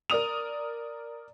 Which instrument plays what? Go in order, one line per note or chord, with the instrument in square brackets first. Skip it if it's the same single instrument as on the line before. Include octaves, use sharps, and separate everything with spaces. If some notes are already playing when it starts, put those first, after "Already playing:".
[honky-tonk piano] A#4 D5 D#6 F7